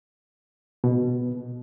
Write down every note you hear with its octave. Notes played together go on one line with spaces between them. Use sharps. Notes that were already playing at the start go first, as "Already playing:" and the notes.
B2